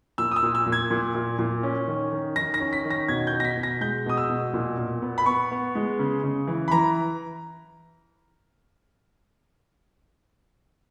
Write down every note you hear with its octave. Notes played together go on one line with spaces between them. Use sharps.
A#2 E6
D#6
E6
A#2
E6
A#2
G#6
A#2
A#2
A#2
C#4
D#3
D#3
D#3 A#6
A#6
C#4
B6
D#3
A#6
B2 G#6
G6
B2
A#6
B6
B2
A#6
G#3 G6
B2 D#6
E6
B2
A#2
A#2
B3
B5
B3 C#6
B3
G#3
C#3
C#3
E3
B5
E3 A#5